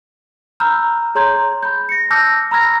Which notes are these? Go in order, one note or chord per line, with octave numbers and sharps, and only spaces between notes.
A#5 B5 E6 F6 G6
G#4 C#5 A#5 C6 G6 G#6
B5 G6
A#6 C#7
A5 D6 E6 F6 G6 A#6
A#5 B5 E6 F6 G#6 A#6